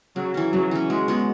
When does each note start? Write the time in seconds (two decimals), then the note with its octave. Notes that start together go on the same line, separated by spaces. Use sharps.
0.16 C#3 F#3
0.34 E3 C#4
0.53 C#3 F#3
0.71 E3 C#4
0.90 F#3 G#3
1.08 B3 F#4